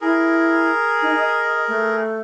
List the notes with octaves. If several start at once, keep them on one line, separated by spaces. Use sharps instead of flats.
E4 G#4 A#4
D#4
D#5
A3